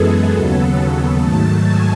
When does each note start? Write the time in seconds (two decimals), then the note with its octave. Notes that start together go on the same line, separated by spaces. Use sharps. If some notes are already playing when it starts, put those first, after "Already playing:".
Already playing: F#2 E3 G#3 B3 G#4 A4
0.31 D#2 C#3 F#3 B3 A4
1.19 G#2 D#3 F#3 A3 A5
1.63 G#5